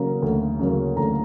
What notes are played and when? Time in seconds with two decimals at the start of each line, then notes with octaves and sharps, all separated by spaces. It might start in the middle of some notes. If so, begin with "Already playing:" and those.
Already playing: C#3 F#3 A#3 A#5
0.22 D2
0.59 C#3 F#3 A#3
0.97 D2 A#5